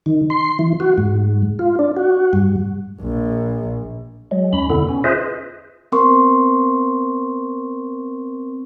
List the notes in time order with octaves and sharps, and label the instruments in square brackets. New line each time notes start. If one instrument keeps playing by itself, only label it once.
[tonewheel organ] D#3
C6
E3
F#4
G#2
F4
D4
F#4
G2
[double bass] A#1
[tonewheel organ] F#3 G#3
D#2 C#4 B5
E2 B2 D3 B3 E4
C#4
F4 G#4 B4 C5 D#5 E5
[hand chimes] B3 C4 A#4 C6 C#6